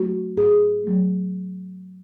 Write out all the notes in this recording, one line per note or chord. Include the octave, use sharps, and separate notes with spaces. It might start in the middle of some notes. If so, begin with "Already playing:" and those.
Already playing: F#3 A3 F#4
G#2 G#4
F#3 A3